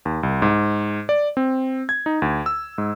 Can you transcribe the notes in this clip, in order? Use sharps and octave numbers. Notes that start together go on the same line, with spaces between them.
D#2
C2
G#2
D5
C4
G#6
D#4
D2
E6
G#2